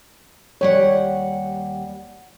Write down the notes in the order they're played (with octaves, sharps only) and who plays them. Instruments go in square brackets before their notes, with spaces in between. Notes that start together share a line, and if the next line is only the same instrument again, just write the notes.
[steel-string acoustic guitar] D#2 G3 F#5 [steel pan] C#5